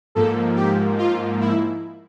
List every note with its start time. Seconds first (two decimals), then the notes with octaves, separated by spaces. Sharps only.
0.15 G#2 F3 A#3 A4
0.56 G4
0.98 F4
1.41 E4